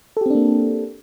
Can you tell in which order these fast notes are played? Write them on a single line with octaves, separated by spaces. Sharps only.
A4 G4 C4 D4 A#3